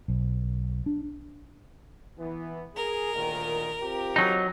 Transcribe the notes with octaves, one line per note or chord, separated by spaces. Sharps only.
B1
D4
E3 B3
G#4 A#4
D2 A#2 D#3
C4 F4 G4
F#3 D#4